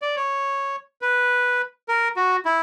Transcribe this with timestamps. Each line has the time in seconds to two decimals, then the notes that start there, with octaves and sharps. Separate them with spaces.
0.02 D5
0.16 C#5
1.02 B4
1.88 A#4
2.16 F#4
2.45 E4